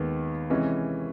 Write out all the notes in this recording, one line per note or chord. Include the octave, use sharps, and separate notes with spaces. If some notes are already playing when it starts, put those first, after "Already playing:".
Already playing: D#2 D#3 G#3 B3 D#4
C3 E3 G#3 C#4